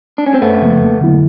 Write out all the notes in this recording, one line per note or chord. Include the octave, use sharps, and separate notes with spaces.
D4
C#4
C4
F#2 A3 B3
C#3 F3 A#3
F2
D3 F#3 B3 E4